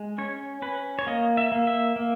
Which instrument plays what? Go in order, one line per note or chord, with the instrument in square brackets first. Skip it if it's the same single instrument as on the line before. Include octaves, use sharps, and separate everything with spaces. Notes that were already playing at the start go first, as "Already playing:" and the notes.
Already playing: [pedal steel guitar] G#3
C#4 C#5
C#4 B4
C#5
A#3 D#5
E5
A#3
E5
A#3